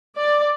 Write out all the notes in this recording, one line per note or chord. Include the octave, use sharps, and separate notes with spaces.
D5